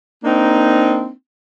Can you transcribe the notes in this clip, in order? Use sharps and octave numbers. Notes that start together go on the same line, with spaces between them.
A#3 C4 D4 D#4